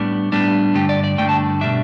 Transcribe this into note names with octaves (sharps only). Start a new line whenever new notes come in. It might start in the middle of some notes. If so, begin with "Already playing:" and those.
Already playing: A2 G3 B3 D4
A2 G3 B3 D4
G2 D3 A3 G4
D5
D5
G2 D3 A3 G5
A5
B2 G3 D4 E5